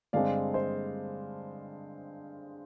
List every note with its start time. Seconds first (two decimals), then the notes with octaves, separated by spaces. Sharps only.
0.13 G2 D3 G#3 C4 D5 F5
0.54 C5 D#5